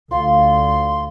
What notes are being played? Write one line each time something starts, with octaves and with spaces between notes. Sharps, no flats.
D2 F4 C6